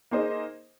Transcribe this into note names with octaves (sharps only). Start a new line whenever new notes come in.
A#3 D#4 G#4 C5 D#5